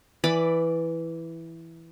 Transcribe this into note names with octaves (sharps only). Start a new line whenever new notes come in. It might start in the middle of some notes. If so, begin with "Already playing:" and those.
E3 D5 B5